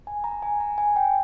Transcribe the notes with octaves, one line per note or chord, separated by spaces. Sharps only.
G#5
A#5
G#5
A#5
G#5
G5